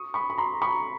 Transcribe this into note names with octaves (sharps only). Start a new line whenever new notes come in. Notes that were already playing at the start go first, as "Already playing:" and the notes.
Already playing: C#6 D#6
B5 C#6
B5
A#5 C6
B5 C#6